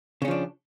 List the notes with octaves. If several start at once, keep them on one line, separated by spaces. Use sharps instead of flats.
C#3 F3 C#4 D4